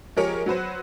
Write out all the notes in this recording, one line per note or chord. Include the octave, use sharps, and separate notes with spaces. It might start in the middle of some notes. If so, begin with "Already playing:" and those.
F3 G#3 G4 G#4 A#4 C#5
F#3 F#4 B4 C5